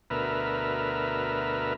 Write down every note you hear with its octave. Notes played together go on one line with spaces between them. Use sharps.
D2 B2 A#4 B4 E5 F6